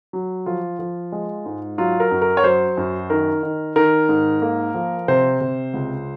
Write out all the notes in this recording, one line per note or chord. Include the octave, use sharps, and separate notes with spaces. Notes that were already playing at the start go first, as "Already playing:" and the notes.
F#3
F3 F4
F3
G#3
G#2
F#3 F4
A#4
F#2
A#4
C#5
F#3 C5
F#2
D#3 A#4
D#3
D#3 A#4
G#2
A#3
F3
C3 C5
C3
C#2